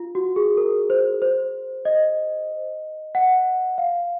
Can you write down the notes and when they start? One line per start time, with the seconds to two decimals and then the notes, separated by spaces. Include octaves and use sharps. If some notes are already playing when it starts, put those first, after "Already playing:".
Already playing: F4
0.15 F#4
0.36 G#4
0.57 A#4
0.90 C5
1.22 C5
1.85 D#5
3.15 F#5
3.78 F5